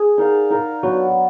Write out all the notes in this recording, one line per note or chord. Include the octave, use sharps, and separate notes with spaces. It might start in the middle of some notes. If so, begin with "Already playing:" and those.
Already playing: G#4
D#4 A#4 D5 F5
D#4 A#4 D5 F5
F#3 B3 D4 F#4